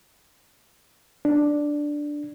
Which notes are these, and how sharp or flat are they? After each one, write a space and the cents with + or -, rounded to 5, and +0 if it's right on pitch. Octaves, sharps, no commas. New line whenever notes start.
D4 +0